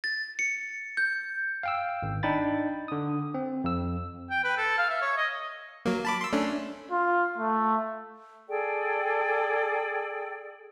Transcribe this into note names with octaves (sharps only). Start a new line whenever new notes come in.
A6
C#7
G6
F5 G5 E6
G#1
D4 D#4 G5 B5 A6
D3 D#6
C4
F2 E6
G5
B4
A4
F5
E5
C#5
D#5
F#3 A#3
A5 B5 D6
C6 E6
A3 C#4 D4
F4
A3
G#4 A4 D5 G5